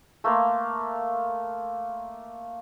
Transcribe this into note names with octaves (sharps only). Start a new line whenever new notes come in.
A3 A#3 F5 C6